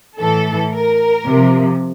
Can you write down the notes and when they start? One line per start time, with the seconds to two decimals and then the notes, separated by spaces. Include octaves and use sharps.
0.19 A2 E3 A4
0.74 A#4
1.27 C3 F3